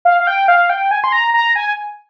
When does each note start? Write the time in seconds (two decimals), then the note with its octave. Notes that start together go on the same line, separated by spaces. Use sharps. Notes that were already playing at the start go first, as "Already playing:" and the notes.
0.05 F5
0.20 F5
0.27 G5
0.48 F5
0.70 G5
0.91 G#5
1.04 C6
1.12 A#5
1.34 A#5
1.56 G#5